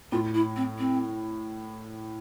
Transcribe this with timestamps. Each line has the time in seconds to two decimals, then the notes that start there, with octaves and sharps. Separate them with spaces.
0.12 A2 F4
0.35 E4
0.56 C4
0.79 C4